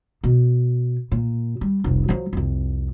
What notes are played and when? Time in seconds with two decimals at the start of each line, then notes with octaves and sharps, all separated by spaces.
0.24 B2
1.12 A#2
1.61 G3
1.84 F1 C2
2.08 F3 F#3
2.33 C2 F2